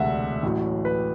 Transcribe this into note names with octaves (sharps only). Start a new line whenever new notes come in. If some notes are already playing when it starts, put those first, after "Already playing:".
Already playing: E1 D2 C3 E5 F#5
A1 A2 F#3
B4